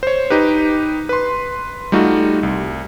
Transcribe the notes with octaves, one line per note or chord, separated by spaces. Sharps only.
C5 C#5
D#4 G4 B4
B4 C6
G3 A3 D#4 F4 F#4
C2